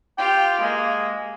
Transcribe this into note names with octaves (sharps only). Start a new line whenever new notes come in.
F4 G4 G5
G#3 A#3